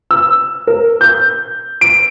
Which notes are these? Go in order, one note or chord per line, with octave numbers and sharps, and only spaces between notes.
E6
A#4
G6
D7